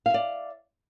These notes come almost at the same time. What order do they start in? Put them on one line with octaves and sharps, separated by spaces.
F5 E5 D5